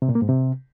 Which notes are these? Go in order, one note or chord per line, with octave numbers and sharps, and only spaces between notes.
C3
A#2
A#3
G#2
C3